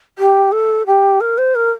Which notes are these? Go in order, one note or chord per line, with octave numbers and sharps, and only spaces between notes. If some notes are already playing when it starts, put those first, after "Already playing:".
G4
A4
G4
A#4
C5
A#4